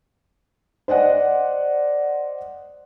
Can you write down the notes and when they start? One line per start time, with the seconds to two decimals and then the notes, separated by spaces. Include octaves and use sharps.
0.88 C5 D5 D#5 F#5